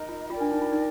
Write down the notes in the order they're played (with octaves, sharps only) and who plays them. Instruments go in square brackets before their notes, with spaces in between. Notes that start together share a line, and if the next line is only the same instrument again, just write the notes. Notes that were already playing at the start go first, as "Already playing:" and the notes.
Already playing: [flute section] D#4 A#4 D#5
[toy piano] F4
[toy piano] F4 [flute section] A#4 D5 G5
[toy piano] D4
D#4
F4
D#4